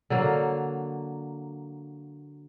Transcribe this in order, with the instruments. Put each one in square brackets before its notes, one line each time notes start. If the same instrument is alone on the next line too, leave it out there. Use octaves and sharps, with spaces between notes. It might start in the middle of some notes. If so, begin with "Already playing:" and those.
[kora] D3 F#3 A#3